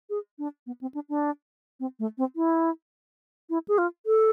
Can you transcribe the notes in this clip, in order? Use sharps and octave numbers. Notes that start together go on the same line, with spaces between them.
G#4
D4
B3
C4
D4
D4
C4
A3
C4
E4
E4
G#4
F4
A4